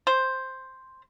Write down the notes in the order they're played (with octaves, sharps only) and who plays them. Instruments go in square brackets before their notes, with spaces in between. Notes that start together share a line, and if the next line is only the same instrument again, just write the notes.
[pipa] C5